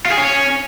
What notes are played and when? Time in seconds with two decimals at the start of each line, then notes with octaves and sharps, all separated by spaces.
0.05 F4
0.12 G#4
0.18 C#4